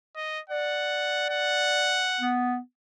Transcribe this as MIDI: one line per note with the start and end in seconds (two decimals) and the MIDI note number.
0.16 0.40 75
0.50 2.08 74
0.50 1.27 78
1.30 2.36 78
2.21 2.58 59